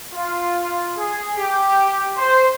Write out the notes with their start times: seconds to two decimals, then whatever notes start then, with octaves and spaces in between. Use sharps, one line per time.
0.12 F4
0.97 G#4
1.38 G4
2.17 C5